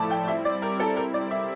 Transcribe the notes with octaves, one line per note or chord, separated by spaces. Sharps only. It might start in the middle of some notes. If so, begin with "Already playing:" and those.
Already playing: A2 F3 A3 E4 D5 A5
G5
G3 C4 E4 E5
D5
A#4
A4
A#4
D5
E5